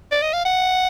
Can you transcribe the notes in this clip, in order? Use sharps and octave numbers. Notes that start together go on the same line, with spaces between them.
D5
D#5
F5
F#5